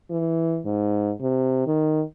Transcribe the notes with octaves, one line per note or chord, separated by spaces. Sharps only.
E3
G#2
C3
D#3